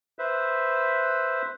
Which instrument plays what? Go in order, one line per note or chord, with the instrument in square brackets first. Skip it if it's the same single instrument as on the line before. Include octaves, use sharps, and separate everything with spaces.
[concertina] B4 C5 E5